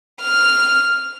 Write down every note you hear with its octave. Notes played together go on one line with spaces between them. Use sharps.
F6